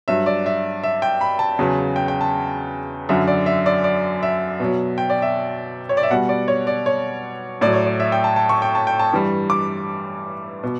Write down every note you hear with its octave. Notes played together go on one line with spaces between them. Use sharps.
G2 F#3 E5
D5
E5
E5
G5
B5
A5
E2 C#3 F#3
G5
G5
A5
F#2 D3 F#3 E5
D5
E5
D5
D5
E5
B2 F#3
G5
D5
E5
C#5
D5
E5
B2 G3 F#5
D5
C#5
D5
C#5
A2 F#3 D5
C#5
D5
E5
G5
A5
A5
C#6
G5
A5
G5
A5
G2 E3 G3
D6
B2